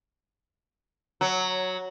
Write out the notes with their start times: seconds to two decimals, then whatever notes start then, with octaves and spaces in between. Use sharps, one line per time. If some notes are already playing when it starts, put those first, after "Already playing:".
1.21 F#3